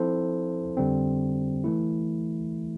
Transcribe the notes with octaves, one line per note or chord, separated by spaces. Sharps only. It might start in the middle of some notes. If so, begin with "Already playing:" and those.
Already playing: F3 C4 E4 A4 C5
F2 D3 G3 C4
E3 A3 E4